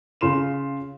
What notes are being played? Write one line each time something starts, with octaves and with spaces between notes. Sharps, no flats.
C#3 F4 C6 E7